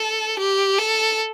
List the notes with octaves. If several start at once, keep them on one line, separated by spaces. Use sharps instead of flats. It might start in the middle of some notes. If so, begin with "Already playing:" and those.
Already playing: A4
G4
A4